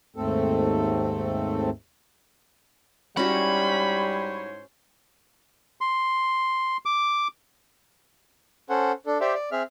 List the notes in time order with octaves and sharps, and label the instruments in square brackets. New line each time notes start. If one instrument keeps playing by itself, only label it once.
[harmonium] D#2 G#2 A3 C4 A4
[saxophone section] G#2 C5 C#5 [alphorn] G3 [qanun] C#4 E4 F#4 [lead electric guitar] B5
[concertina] C6
D6
[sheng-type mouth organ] C#4 A4 C5 F#5
D4 A4
G4 C5 D5 E5
D5
C4 G#4 E5 F6